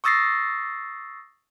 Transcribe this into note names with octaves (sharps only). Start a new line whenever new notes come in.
C#6 D#6 E6 A6 A#6 C7